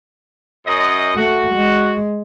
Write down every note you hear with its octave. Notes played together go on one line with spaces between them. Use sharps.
F#2 D#5
A3 F#4
G#3